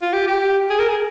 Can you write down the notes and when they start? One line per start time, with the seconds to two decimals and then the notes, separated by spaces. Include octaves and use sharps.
0.02 F4
0.13 G4
0.27 G4
0.70 G#4
0.79 A#4
0.89 G#4